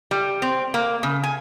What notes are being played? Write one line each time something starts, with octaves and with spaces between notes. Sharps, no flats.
G3
C4
A#3
C#3
G#5